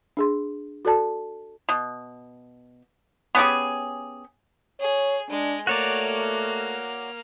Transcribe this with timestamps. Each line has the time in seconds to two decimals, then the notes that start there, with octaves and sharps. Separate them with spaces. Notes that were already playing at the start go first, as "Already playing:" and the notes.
0.17 D4 G#4 C6
0.85 F#4 A4 D5 A5
1.69 B2
3.35 B3 C#4 G4 G#4
4.81 G#4 C#5
5.30 G#3 D4
5.67 A3 A#3 F#4 C#5 D5 F6